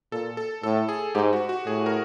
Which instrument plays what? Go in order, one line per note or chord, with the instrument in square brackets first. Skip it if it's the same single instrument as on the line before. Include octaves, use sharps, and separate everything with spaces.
[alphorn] A#2 [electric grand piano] A4
[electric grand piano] A4
[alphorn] A2 [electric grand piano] A4
[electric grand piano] G#4
[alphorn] G#2 [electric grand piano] G4
[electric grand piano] F#4
F#4
[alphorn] A2 [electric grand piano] G#4
[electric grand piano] A#4